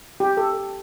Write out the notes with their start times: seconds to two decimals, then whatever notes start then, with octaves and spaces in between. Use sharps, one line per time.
0.20 G4
0.37 A4